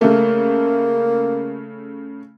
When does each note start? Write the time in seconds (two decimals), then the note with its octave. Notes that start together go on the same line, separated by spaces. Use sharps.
0.01 C#3 A3 A#3